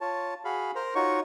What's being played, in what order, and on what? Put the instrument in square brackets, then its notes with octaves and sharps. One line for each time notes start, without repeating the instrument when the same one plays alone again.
[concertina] F4 C#5 A5
F#4 G#4 F5 B5
A#4 C5 A#5
D#4 F4 F#4 C#5 C#6